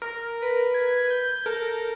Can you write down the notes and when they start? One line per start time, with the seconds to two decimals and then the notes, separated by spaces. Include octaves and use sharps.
0.02 A#4
0.42 B4
0.74 G#6
1.10 G6
1.46 A4 A#4